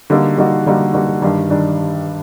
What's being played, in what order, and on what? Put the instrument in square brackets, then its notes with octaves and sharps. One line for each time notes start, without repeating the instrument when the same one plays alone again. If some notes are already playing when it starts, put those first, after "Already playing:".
[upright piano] D3 G3 A#3 D#4 F#4
D3 G3 A#3 D#4 F#4
D3 G3 A#3 D#4 F#4
D3 G3 A#3 D#4 F#4
G2 D#3 G3 D4
D#3 G3 D4